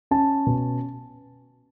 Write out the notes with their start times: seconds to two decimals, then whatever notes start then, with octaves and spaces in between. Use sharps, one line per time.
0.11 C#4 A5
0.47 B2